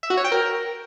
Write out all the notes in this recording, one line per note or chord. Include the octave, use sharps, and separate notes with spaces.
E5
F#4
C#5
G5
A#4